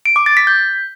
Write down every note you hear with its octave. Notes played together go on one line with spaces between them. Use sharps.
D7
D6
A6
B6
G6